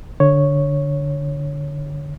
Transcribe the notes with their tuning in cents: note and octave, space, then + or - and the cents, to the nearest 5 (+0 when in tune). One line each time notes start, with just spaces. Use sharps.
D3 +0 C#5 +0